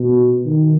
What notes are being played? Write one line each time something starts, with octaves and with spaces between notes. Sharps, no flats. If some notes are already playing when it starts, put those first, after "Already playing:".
Already playing: B2
D#3